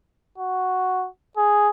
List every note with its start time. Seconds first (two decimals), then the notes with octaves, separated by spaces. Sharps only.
0.38 F#4
1.37 G#4